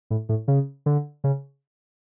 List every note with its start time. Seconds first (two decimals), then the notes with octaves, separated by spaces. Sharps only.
0.10 A2
0.29 A2
0.48 C#3
0.86 D3
1.24 C#3